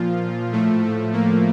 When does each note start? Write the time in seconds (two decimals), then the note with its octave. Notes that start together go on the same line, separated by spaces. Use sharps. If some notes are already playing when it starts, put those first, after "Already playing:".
Already playing: A#2 F3 F4
0.53 A2 F3 A3
0.83 A3
1.13 A#3